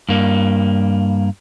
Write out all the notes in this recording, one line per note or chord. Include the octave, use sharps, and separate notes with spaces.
G2 A#3